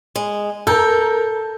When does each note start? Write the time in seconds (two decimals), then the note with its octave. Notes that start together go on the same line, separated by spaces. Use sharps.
0.16 G#3
0.67 A4 A#4 A#5 G6